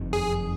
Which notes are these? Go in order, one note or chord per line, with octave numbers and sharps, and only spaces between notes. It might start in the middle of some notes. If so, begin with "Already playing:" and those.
Already playing: F#1 F2 C3 D#3
G#4